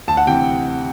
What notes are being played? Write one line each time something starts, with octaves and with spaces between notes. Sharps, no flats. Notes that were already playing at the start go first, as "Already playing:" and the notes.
D2 A5
F#5
C3 E3 G5